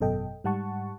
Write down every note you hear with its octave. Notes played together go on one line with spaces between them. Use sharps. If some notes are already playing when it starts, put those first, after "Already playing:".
G#1 F#2 B2 A4 D#5 G5
G#2 G3 F#5 A5 C#6